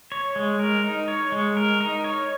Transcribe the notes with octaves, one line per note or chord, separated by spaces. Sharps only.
C#5
G#3
A#4
D#4
C#5
G#3
A#4
D#4
C#5